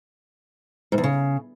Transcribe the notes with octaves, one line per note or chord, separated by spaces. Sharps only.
G#2
E2
C#3